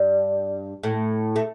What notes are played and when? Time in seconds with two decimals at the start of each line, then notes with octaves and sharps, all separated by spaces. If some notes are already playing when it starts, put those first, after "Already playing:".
Already playing: G2 G3
0.83 A2 A3
1.36 A3